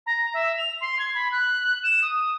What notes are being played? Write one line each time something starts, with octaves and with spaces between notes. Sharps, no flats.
A#5
E5
F7
C6
G#6
B5
F#6
E7
D#6